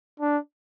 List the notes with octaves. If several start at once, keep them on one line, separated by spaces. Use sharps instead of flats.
D4